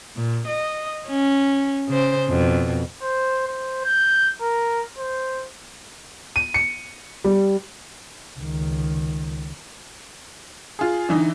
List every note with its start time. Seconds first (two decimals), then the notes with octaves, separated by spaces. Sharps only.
0.16 A#2
0.47 D#5
1.07 C#4
1.88 C#3 C5
2.29 F2 B2
3.02 C5
3.47 C5
3.85 G6
4.41 A#4
4.98 C5
6.36 D#7
6.54 C#7
7.24 G3
8.39 C#2 D#3
10.79 F4 G#4
11.09 D3 E3 D#4